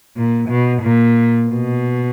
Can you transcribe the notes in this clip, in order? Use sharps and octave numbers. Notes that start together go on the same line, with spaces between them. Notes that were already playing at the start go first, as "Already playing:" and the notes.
A#2
B2
A#2
B2